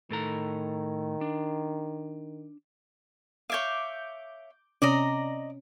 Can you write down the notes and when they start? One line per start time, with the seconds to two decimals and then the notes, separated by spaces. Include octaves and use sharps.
0.10 A2 D#3 A4 A#5
1.21 D4
3.50 C#5 E5 F5 D6 G6
4.82 C3 C#4 D5 D#5 A#5